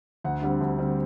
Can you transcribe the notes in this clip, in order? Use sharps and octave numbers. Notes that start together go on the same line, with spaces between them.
D2 F#5
D3 G3 C4
D2
D3 G3 C4